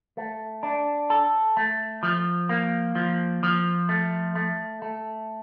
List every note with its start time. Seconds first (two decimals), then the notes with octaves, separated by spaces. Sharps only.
0.17 A3
0.63 D4
1.10 A4
1.57 A3
2.03 F3
2.49 A#3
2.95 F3
3.43 F3
3.89 A3
4.35 A3
4.82 A3